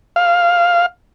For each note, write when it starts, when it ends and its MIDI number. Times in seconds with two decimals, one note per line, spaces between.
0.16 0.86 77